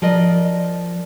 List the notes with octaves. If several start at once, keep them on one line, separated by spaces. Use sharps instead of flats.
F3 A#4 D5 D#5